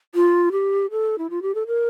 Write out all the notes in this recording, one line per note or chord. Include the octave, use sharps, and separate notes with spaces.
F4
G4
A4
E4
F4
G4
A4
A#4